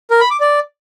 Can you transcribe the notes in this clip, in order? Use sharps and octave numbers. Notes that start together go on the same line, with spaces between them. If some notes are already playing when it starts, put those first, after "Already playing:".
A#4
B5
D6
D5